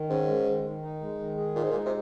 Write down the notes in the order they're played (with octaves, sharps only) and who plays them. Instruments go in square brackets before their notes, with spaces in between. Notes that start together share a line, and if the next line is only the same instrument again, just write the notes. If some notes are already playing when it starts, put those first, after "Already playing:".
Already playing: [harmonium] D#3
[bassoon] G#2 [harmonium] C#4
[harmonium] G#3
D#3
D#3
D#4
G#3
D#3
G#4
[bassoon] A#2 [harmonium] D#4
[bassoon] G#2
A#2
[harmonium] G#3
[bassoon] C3